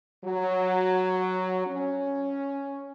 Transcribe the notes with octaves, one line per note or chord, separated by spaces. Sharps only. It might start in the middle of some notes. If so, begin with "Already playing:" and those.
F#3
C#4